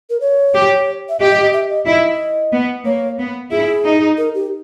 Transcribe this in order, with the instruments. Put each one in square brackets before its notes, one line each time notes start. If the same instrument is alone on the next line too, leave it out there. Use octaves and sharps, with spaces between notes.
[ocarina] A#4
C#5
[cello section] G4
[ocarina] E5
[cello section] G4 [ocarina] D#5
[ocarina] D#5
D#5
E5
D#5
[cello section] E4 [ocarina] D#5
[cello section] B3
[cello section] A#3 [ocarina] C#5
[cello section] B3
[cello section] E4 [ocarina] G#4
[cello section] D#4
[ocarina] A#4
G4